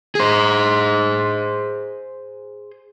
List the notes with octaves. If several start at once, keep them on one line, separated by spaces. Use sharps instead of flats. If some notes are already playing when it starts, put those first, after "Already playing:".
G#4 C5